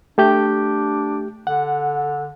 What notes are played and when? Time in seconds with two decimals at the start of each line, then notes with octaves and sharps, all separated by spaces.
0.18 A3 D4 G4 G6
1.47 D3 F#5